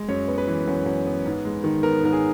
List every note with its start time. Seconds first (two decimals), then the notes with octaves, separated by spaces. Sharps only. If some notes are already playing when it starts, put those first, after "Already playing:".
Already playing: G#3
0.08 F#2 C#5
0.28 B3
0.38 B4
0.47 E3
0.68 F#2
0.86 F#2
1.06 B3
1.26 G#2
1.45 G#3
1.64 D#3
1.83 B3 A#4
2.02 G#2 A#4
2.13 G#4